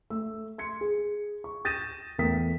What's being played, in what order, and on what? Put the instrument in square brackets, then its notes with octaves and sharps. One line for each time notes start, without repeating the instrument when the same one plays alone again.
[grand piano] A3 E6
C6 G#6 C#7
G#4
C#6
D#6 G6 A6 A#6 D#7 E7
E2 A3 A#4 G5 D#6 B6